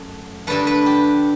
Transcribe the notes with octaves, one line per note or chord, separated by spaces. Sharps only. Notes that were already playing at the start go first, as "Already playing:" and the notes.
Already playing: F#2 A3
G2 D3 A3 B4
B4
G4